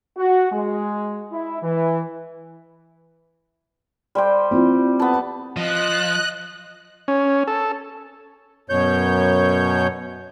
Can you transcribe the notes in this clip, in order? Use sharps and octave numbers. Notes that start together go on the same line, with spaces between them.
F#4
G#3
E4
E3
G3 C5 G5
C4 E4 F4
B3 A5
F3 D#5 F#6
C#4
A4
F#2 B2 C#5 G6